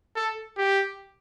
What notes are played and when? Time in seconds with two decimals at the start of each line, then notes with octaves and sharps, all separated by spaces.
0.16 A4
0.57 G4